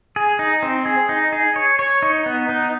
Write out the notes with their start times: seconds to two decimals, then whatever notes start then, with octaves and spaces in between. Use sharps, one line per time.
0.16 G#4
0.39 D#4
0.63 C4
0.86 G#4
1.09 D#4
1.33 G#4
1.56 C#5
1.79 C#5
2.02 D#4
2.26 B3
2.49 D#4